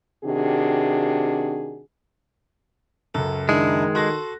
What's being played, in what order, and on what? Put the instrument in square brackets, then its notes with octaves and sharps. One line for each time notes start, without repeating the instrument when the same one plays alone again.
[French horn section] C3 D#3 D4 F#4 G#4
[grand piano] C#2 F#2 [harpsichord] A4
[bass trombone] D#3 [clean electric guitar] G#3 [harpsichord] D4 E4
[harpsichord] F#4 A4 [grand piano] C6 F#6 A#6